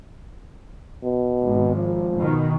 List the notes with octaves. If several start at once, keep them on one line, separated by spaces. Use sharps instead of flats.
B2
G#1
F3
B2 D#3